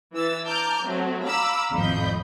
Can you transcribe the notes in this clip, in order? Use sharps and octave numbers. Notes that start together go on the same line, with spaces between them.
E3 E6 A6
A5 A#5 D6 F6 G6
F#3 A3 C4
F5 A#5 B5 D6 E6
G#1 F2 A2 D#5 B5 G6